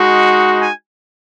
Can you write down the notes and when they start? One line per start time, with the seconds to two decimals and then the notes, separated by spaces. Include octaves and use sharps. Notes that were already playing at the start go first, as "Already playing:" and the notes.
Already playing: G#3 D#4 F#4
0.62 G#5